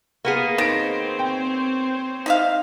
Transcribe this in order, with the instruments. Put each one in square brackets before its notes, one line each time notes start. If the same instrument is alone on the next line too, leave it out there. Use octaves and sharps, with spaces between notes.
[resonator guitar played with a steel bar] A#3 B3 G#4
[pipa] D#3 [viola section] C4 C5 C#5 [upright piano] A#6 D7
[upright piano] G5
[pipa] D#4 E5 F5